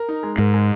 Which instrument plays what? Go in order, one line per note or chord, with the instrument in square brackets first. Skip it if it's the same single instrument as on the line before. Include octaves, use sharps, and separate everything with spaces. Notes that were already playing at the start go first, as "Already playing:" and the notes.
Already playing: [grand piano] A#4
D#4
G#3
[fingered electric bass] G#2 [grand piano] A#4
[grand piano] G#3